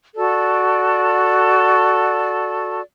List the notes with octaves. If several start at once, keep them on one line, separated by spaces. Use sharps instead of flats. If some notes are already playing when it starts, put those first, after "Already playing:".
F#4 A4 D5